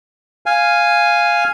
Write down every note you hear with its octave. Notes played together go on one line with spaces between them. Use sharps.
F5 G#5